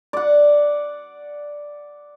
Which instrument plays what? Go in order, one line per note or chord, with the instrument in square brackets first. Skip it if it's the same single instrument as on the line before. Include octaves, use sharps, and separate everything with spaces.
[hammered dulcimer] D5 F#5